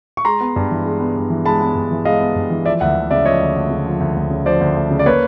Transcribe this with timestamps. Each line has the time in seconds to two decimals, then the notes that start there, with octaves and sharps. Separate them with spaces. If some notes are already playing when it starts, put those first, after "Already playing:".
0.17 C#6
0.25 G#3 A#5 C6
0.41 B3
0.56 G2
0.71 E3
0.86 G#3
1.00 B3
1.16 G2
1.30 E3
1.46 G#3 A5 B5
1.61 B3
1.75 G2
1.91 E3
2.05 G#3 D#5 F5
2.20 B3
2.36 G2
2.50 E3
2.65 F3 D5 E5
2.80 D2 E5 F#5
2.96 D2
3.11 C#3 D5 E5
3.25 F3 C#5 D#5
3.41 D2
3.56 D2
3.70 C#3
3.86 F3
4.00 D2
4.16 D2
4.30 C#3
4.46 F3 C5 D5
4.60 D2
4.76 D2
4.91 C#3
4.99 D5
5.06 A#3 B4 C#5